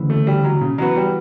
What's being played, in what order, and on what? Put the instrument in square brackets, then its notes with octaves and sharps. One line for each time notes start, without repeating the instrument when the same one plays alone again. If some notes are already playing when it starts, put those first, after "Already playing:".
Already playing: [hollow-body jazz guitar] D2 C#3 E3
[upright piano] A3
G3
F#3
C#3
[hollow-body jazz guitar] E3 B3 F#4 B4 [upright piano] F#3
[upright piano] G3